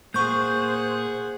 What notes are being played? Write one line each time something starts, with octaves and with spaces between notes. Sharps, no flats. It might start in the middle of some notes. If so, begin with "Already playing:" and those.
A#2 A#3 G#4 C5 F#5 C#6 G6